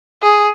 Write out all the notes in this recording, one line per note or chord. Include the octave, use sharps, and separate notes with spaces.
G#4